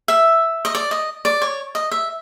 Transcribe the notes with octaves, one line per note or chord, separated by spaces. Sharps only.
E5
D#5
D5
D#5
D5
C#5
D#5
E5